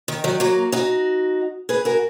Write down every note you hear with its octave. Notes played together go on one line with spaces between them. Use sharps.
D#3
D#3 F#3
F#3 A#3
D#4 F#4
G#4 B4
F#4 A#4